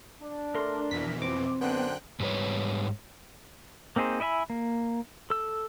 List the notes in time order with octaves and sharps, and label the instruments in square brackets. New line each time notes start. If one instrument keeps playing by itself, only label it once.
[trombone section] D4
[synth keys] A3 [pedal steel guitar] A#4 C6
[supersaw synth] F2 B2 E3 [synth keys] B6
[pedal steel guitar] C4 [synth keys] D6
[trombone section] F#2 D3 C5 [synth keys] B3 [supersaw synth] G5 F#6
[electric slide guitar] G#2 F#3 G3 B4 C#5
[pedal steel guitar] A#3 C4 D#4 G#4 C5
E4 D#5 E5 G#5 B5
A#3
A4 E6